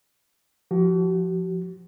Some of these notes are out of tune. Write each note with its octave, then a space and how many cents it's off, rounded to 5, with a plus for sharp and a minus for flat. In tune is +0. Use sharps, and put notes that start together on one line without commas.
F3 +0 F#4 +45